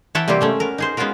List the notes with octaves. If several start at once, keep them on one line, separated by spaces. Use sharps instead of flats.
E3 C#5 E5 F#5 G5 A5
C3 G3 A#3 C4 G4 C5
G#3 A3 C#4
B3 A#4
D#4 G#4 C5
G#3 B3 C#4 F4 F#4 A#4